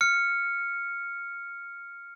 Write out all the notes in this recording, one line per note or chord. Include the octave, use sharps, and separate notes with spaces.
F6 C#7